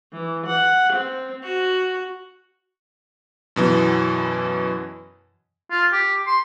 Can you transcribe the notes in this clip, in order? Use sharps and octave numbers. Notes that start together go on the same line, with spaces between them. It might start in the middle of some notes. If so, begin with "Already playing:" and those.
E3
F#5
C4
F#4
F#2 B2 E3
F4
G4
C6